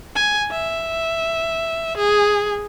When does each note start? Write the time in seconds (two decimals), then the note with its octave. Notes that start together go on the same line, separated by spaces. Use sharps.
0.16 G#5
0.52 E5
1.97 G#4